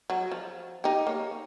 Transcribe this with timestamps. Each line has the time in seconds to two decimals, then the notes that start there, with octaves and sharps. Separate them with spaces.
0.10 F#3
0.32 F3
0.84 D#4 G4
1.07 A#3 C#5